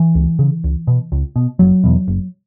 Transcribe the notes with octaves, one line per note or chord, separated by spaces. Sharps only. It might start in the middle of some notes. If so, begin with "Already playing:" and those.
Already playing: E3
C#2
C#3
C#2
B2
C#2
B2
F#1 F#3
E2 B2
F#1